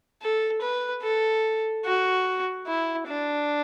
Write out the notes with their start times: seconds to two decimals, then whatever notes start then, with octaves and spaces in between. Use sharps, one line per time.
0.22 A4
0.62 B4
1.03 A4
1.85 F#4
2.67 E4
3.07 D4